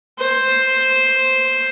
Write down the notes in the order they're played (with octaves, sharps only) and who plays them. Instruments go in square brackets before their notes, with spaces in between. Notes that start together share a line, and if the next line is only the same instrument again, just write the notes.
[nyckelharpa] C5